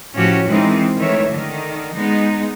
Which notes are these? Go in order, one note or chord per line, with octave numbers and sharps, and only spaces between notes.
A2 F3 C#4 F#4 G4
D#3 E3 G#3 C4 D#4
D#3 E3 A3 C#5 E5
D3 D#3
G#3 B3 D#4